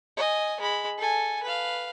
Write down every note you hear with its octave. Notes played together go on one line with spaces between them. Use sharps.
D#5 G#5
G#3 B5
A4 G#5
B4 F5